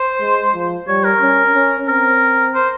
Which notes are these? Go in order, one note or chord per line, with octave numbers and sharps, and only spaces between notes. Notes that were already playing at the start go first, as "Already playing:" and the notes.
Already playing: C5
G#3
F3
G3 C#5
A#4
C#4
C#4
C4 A#4
C5